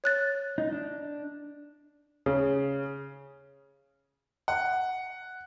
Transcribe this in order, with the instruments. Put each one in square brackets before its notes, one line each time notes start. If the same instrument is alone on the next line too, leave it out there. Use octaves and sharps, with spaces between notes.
[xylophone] C#5 F#6 A6
[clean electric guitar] D#4
D4
[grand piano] C#3
[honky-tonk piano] F#5